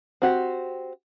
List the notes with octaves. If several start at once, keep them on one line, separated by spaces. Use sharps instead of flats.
C4 F#4 G4